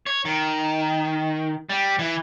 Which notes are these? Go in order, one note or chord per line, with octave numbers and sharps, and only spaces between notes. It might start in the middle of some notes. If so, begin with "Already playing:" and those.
C#5
D#3
G3
E3